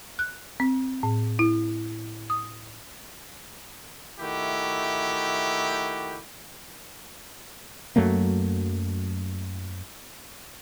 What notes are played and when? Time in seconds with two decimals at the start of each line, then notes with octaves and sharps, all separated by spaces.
0.19 F#6
0.60 C4
1.03 A2
1.39 E4
2.30 D#6
4.20 D#3 A3 E4 F#4 G4
7.96 F#2 F#3 A3 A#3